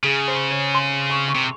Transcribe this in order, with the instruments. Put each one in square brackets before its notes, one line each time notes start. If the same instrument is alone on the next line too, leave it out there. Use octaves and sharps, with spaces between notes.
[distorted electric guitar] C#3 [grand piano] G#4
[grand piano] C5
C#5
C6
C#6
C#6
[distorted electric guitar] C3